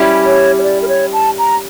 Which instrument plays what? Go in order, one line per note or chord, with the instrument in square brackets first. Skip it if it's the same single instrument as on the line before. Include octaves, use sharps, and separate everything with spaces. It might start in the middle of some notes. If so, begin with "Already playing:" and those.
Already playing: [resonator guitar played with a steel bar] G3 C#4 E4 G4
[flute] C#5
C#5
D5
A#4
C#5
A5
A#5